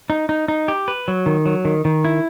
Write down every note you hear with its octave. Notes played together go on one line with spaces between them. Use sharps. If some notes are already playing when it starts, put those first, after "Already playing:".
D#4
D#4
D#4
G4
B4
F#3
D#3
F#3
D#3
D#3
E4